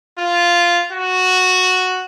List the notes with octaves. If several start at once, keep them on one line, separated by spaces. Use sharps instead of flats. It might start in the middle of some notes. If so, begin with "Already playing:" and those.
F4
F#4